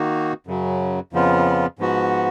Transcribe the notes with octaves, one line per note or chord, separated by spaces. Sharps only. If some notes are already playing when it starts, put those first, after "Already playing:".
Already playing: D#3 A#3 D#4 F#4
F#2 C#3 F#3
F2 C#3 F3 B3 F4
G#2 F3 B3 F#4